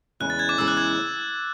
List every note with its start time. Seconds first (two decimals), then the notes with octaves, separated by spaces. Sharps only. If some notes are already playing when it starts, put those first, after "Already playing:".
0.20 E2 C#3 G#3 C#4 F#6
0.30 A6
0.39 G#6
0.49 D6
0.58 E2 C#3 G#3 C#4 E6
0.68 F#6
0.77 G#6